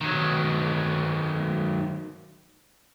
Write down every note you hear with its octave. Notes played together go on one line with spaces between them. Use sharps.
D#3 F#3